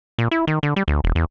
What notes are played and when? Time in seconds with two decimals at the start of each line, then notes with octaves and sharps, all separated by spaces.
0.18 A#2
0.31 E4
0.47 D#3
0.63 D3
0.76 G3
0.88 D2
1.04 E1
1.15 E2